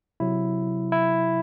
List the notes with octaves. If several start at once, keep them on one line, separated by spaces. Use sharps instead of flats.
C3 F#3 E4
E4